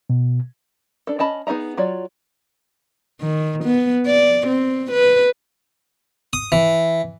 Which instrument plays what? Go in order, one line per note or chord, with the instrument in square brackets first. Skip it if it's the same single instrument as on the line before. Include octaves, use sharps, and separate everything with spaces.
[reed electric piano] B2
[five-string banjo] D4 A4
C#4 D#5 A5 B5
B3 D#4 G#4 D#5 A#5
F#3 F4 C#5 D5
[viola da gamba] D#3
B3
D5
C4
B4
[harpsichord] D#6
E3